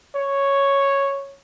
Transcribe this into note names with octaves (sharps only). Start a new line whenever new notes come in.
C#5